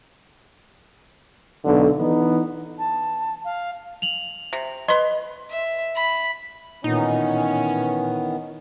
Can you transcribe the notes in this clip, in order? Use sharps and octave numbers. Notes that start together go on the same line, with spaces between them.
B1 D3
E3 B3 D#4
A5
F5
F7 F#7
C3
B4 D#5 C6
E5
B5
A#2 D#3 E3 B3 C#4 D#4